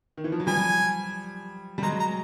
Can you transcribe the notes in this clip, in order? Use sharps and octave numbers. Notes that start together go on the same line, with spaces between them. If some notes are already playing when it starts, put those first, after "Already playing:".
D#3
E3
F3
F#3
F3 G3 G#5
G3
F#3 G#3 A#5
A#5